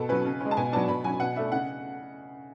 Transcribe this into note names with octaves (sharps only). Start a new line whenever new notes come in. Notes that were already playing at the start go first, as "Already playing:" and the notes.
Already playing: B2 A4
F#3 C#4 B4
C#3
G#3 C#4
A5
B2 G#5
F#3 B3 D4 A5
B2 B5
F#3 C#4 G#5
B2 F#5
A3 D4 E5
C#3 F#5